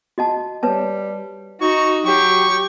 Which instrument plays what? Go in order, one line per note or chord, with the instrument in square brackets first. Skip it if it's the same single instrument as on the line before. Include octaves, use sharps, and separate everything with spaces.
[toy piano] F#4 D#5 A5
[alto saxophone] G3 [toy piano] B4 C#5 A5
[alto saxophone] D#4 [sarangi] F#4 [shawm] C#6
[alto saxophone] F#3 [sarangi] G4 [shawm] C#6